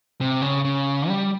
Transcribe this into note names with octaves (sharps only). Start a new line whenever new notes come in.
C3
C#3
C#3
G3